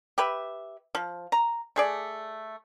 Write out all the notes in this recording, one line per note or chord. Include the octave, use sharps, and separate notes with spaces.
G4 B4 E5
F3
A#5
A3 G#4 D5